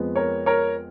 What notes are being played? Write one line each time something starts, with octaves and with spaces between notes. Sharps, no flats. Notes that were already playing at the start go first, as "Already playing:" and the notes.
Already playing: F2 F3 G#3 B3
A#4 C#5
A#4 C#5